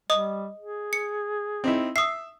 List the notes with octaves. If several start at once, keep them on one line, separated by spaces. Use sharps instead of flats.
G3 D#5 D#6
G#4
C#7
C4 D#4 E4
E5 D#6 C7